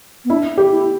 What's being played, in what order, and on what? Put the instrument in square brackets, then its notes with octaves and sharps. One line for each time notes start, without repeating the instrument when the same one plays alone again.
[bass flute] B3
[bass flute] D4 [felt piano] E4
[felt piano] G4
[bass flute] E4